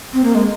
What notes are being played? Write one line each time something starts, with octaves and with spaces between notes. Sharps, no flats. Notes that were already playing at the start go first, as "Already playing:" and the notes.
C4
A#3
G#3